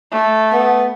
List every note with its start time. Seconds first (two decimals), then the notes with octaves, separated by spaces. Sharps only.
0.12 A3
0.53 B3